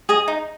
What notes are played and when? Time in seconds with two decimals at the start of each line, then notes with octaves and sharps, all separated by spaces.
0.09 G#4 D#5
0.28 D#4